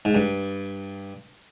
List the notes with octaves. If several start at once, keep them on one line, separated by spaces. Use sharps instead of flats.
G#2
G2